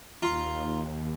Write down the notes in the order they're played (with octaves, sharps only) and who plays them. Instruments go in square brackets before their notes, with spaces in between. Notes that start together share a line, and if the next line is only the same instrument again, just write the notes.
[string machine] D#2 [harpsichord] F4 [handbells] A#5 C6